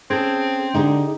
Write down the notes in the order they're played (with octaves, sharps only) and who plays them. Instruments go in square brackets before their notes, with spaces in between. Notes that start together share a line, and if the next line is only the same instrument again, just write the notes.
[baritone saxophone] C4 [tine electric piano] C#4 G6 G#6 [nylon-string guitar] G#4 A4
[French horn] D3 [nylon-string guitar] D#4 G4 G#4